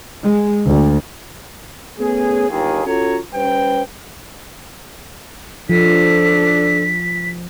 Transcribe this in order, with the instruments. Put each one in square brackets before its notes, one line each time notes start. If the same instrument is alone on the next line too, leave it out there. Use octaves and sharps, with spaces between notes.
[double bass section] G#3
D2
[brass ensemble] A3 B3 C#4 G#4
G1 D#2 G#4
C#4 F4 F#4 A4 C#5 A#5
G3 C#4 B4 C5 G5
[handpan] F3 [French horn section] D4 [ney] A4 [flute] B6